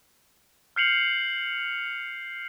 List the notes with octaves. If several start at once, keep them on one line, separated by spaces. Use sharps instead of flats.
F6 G6 C7 C#7 F7 F#7